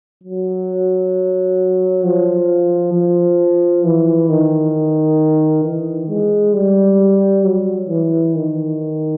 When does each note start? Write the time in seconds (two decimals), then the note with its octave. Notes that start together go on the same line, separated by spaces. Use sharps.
0.23 F#3
2.04 F3
2.93 F3
3.84 E3
4.29 D#3
5.63 E3
6.09 G#3
6.53 G3
7.44 F#3
7.89 E3
8.35 D#3